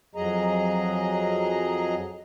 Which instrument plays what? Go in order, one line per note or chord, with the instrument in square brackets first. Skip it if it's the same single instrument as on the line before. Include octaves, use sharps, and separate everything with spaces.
[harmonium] F2 F#3 G#4 D#5 A#5